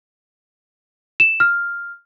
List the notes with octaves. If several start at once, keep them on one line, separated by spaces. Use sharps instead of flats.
E7
F6